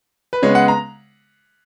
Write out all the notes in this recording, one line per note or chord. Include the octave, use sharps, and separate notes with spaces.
B4
C#3 G#3 B3 C#5
F#5
A#5